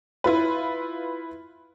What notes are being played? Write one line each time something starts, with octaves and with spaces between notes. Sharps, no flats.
E4 F4 B4